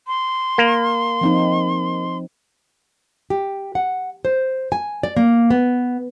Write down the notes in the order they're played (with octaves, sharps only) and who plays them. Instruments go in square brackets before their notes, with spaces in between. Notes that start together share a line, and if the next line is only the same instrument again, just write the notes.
[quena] C6
[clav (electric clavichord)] A#3
[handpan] F3 C4 D#4
[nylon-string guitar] G4
F#5
C5
G#5
D5
A#3
B3